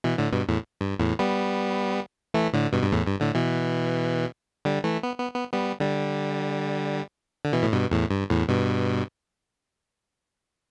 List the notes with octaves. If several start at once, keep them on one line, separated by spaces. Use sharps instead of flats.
B2 E3
A2 D3
G2 B2
E2 A2
G2
E2 A2
G3 B3
E3 A3
A2 D3
G2 B2
G2
E2 A2
G2
A2 D3
B2 E3
D3 G3
E3 A3
B3
B3
B3
G3 B3
D3 G3
D3
B2 E3
A2
G2 B2
E2 A2
G2
E2 A2
G2 B2